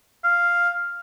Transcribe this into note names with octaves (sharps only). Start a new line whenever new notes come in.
F5